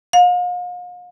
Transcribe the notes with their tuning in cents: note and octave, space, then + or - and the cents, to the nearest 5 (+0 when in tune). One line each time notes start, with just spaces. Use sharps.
F5 +40